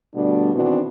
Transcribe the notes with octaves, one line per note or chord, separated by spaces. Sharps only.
B2 D3 G3 A3 D4
B2 D#3 E3 C4 D4 F#4